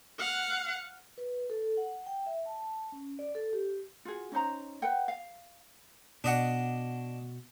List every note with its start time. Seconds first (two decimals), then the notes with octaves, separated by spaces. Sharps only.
0.19 F5 F#5
1.18 B4
1.50 A4
1.77 F#5
2.06 G5
2.26 E5
2.46 A5
2.92 C#4
3.19 D5
3.35 A4
3.53 G4
4.05 F4 F#4 G#4
4.32 C#4 D#4 C5 A#5
4.82 B4 E5 F#5 G5
5.08 F5
6.24 B2 D4 D#5 F#5